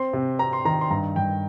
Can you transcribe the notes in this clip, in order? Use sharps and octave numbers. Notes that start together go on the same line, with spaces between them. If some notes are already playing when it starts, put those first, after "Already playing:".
Already playing: C4 C6
C3
C4 A#5
C6
D#3 A#5
C6
G2 A#5
G2 G5